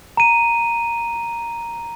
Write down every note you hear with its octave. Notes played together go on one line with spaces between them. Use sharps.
A#5 D#7